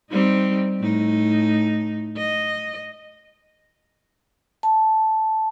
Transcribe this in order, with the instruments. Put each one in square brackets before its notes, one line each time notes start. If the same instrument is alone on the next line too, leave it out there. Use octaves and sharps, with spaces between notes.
[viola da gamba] G3 C4 D#4
A2 D#4
D#5
[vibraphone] A5